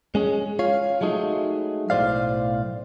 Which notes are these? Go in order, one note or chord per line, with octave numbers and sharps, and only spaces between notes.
G#3 C#4 G#4
F4 C#5 F5
F#3 G#3 A3 D#4
B1 A2 D#3 C5 D5 F5